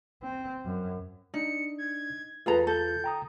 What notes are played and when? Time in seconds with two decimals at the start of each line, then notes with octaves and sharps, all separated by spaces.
0.22 C4
0.65 F#2
1.34 D4 D#4 C#7
1.78 G#6
2.46 E2 F4 G#4 A4 B4 A#5
2.67 A4 G6
3.04 G5 A#5 D#6